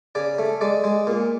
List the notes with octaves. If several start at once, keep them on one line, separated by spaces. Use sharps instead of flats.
C#3 D5
A3
G#3 D5
G#3
A#2